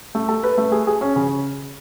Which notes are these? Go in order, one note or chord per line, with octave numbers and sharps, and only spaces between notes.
A3
A4
B4
A3
G#4
G#4
C#4
C#3